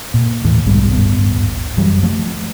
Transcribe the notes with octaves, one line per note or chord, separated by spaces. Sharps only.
A#2
D#2 A2 E3
B1 G#2 B2 G3
D1 G#1 G2 B3
F#2 E3 F#3 G3
F3 A3